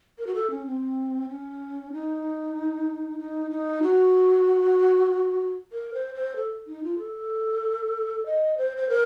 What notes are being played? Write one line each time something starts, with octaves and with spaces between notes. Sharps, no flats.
A#4
F#4
A4
C#4
C4
C#4
D#4
D#4
D#4
F#4
A#4
C5
C5
A4
D#4
F4
A4
D#5
C5
C5
A#4